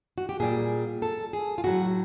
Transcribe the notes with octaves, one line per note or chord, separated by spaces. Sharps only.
F#4
G4
A#2 G3 G#4
A4
G#4
F4
A2 F#3 F#4